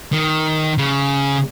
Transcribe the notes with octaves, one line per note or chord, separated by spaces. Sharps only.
D#3
C#3